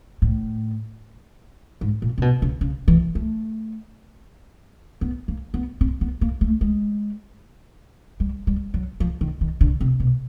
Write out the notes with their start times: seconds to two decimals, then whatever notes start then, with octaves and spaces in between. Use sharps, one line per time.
0.22 A2
1.81 G#2
2.02 A#2
2.18 C3
2.22 B2
2.42 C#3
2.61 C#3
2.88 E3
3.15 A3
5.01 B3
5.28 A#3
5.54 B3
5.81 C4
6.01 B3
6.21 A#3
6.41 A3
6.61 G#3
8.20 G3
8.47 G3
8.74 F#3
9.00 F3
9.21 D#3
9.41 D#3
9.61 D3
9.81 C3
10.00 B2